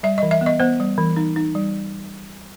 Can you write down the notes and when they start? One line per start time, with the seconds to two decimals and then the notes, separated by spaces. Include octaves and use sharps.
0.03 G3 E5
0.18 E3 D#5
0.31 E5
0.41 B3
0.46 D#5
0.60 B3 C5
0.80 G3
0.98 E3
1.16 D#4
1.36 D#4
1.55 G3